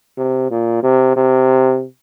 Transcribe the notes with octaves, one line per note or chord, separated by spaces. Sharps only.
C3
A#2
C3
C3